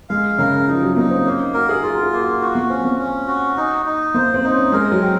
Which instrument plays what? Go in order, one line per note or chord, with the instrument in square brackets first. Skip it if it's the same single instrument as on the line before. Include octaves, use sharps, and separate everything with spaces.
[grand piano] G#3 [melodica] F5
[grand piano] C#3 [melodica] A#4
[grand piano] F3 [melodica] D#4
[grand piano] F#3
[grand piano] A#3 [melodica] D#4
[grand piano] C4
[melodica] A#3 [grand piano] C#4
[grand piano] D#4
[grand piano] F#4 [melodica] A#4
[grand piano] G#4
[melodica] F4 [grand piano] F#4
[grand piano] G#4
[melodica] A#3
[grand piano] F#4
[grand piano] F4 [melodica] F#4
[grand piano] A#3
[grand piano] C4 [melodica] C#4
[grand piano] A#3
[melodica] C#4
F#4
D#4
D#4
[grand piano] A#3 [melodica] C5
[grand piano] C4
[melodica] D#4
[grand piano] C#4
[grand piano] G#3 [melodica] A#4
[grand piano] F#3
[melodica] C4